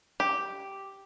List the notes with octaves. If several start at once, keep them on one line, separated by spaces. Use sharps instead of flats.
G4